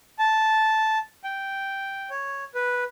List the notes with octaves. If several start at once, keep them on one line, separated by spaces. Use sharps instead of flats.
A5
G5
C#5
B4